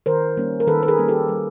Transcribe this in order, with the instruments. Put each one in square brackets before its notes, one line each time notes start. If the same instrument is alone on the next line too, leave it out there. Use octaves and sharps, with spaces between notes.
[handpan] D#3 A#4 C5
G3 A#3 C#4
A#4
D#3 A4 B4
B4
G#4 A#4
G3 A#3 C#4
G4 A4
G3